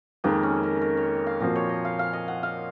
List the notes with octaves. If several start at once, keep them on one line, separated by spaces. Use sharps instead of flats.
F2 D#3 G#3 A#3
C#4
A#4
A#4
C#5
F5
A#2 F3 C4 F#4 D#5
C#5
D#5
F5
F5
D#5
F#5
F5